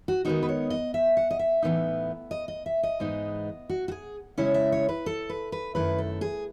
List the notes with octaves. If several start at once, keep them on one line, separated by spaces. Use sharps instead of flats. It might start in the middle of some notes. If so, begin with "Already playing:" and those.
F#4
D#3 G#3 B3 D#4 F#4
B4
C#5
D#5
E5
F#5
D#5
E5
A2 E3 G#3 B3 D#4
D#5
D#5
E5
D#5
G#2 E3 G#3 B3 D#4
F#4
F#4
G#4
C#3 G#3 C#4 E4 C#5
E5
C#5
B4
A4
B4
B4
F#2 D#3 A3 E4 B4
A4
G#4